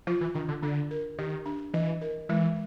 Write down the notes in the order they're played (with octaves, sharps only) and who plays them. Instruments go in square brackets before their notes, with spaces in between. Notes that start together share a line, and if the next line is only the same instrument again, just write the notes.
[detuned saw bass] F3 [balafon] F4
[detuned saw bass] E3
[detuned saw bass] D#3 [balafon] D4
[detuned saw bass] D3
[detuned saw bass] D3 [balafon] D4
[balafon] A#4
[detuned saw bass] D#3 [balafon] G4
[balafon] D4
[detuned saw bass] E3 [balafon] D#5
[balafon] A#4
[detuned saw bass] E3 [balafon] G#3